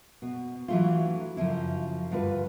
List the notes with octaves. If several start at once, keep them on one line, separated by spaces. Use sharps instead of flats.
B2
E3 F#3 G3 A3 D4 F4
F#2 C#3 F3 E4
D2 G2 F4 B4